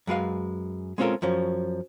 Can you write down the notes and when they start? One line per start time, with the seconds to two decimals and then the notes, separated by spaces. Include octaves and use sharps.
0.07 F#2 G#3 B4 F5
0.98 G#3 C4 C#4 F4 A4 A#4
1.22 F#2 F3 C#4